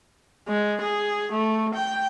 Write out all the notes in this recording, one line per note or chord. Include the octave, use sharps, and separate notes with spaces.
G#3
G#4
A3
G5